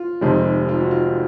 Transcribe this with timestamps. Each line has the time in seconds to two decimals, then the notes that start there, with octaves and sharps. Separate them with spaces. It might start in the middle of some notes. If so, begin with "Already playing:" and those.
Already playing: F4
0.21 F1 F2 C3 D#3 G#3
0.69 F4
0.81 F#4
0.91 F4